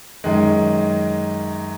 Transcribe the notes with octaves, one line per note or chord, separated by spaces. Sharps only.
F#2 D#3 G#3